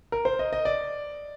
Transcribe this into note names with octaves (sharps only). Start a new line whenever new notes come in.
A#4
C5
D#5
D#5
D5